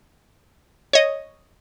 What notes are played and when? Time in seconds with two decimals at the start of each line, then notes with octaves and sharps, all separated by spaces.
0.93 C#5 D#5